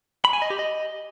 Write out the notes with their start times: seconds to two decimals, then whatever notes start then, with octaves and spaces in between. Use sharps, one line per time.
0.25 B5
0.33 G#5
0.42 D#5
0.50 G4
0.59 D#5